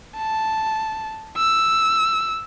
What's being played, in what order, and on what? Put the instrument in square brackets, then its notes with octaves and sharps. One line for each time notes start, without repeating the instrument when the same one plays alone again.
[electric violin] A5
E6